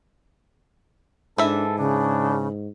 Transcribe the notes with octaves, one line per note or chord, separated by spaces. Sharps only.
G#2 E3 D4 A4 E5
C#3 D4